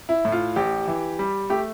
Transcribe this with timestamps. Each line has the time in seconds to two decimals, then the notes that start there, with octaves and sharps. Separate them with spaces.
0.09 E4
0.25 A2
0.32 F4
0.56 A1 G4
0.88 E3
1.19 G3
1.50 A3 G4